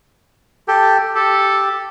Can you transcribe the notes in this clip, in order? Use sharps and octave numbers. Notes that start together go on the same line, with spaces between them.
G4 A4 G5
G4 A4